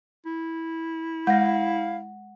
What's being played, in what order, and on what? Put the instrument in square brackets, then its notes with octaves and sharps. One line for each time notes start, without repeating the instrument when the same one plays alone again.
[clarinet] E4
[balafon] G#3 [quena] F5 [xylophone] F#5 A#6